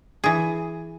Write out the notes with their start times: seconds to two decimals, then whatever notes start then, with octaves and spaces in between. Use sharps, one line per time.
0.24 E3 G#4